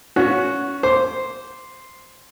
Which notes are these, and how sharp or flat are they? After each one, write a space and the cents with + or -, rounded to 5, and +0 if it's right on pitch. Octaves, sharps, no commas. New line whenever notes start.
C#4 +25 F#4 -5
C5 +0 D6 -15